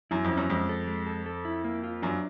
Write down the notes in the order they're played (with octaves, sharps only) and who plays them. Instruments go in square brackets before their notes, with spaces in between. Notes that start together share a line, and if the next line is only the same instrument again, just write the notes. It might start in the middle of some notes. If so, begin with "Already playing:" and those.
[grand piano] F#2 [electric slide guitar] E4
[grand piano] F2
[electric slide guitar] C#4
[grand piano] F#2
[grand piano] F2 [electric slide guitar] G#3
[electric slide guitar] A4
G#3
A4
A4
E4
A#3
F4
[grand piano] F#2 [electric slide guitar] D4